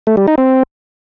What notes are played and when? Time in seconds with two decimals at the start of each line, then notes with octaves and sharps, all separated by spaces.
0.07 A3
0.17 G3
0.28 D#4
0.38 C4